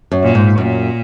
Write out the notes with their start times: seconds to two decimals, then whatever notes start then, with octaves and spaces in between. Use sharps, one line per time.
0.11 F#2
0.23 A#2
0.35 G#2
0.58 F#2 A#2